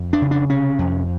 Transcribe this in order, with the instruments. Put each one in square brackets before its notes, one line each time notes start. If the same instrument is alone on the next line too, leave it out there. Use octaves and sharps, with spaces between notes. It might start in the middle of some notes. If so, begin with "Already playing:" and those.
Already playing: [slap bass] F2
D4
C#3
D4
C3 C#4
F2